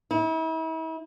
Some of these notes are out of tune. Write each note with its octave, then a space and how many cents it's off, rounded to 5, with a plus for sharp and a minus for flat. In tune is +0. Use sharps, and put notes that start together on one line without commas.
E4 -40